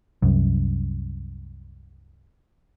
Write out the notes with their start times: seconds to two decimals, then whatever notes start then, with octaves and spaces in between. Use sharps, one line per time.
0.22 C2 F#2